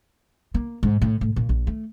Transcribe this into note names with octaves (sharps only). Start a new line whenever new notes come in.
A#3
G#2
A2
A2
A#2
A#1
A3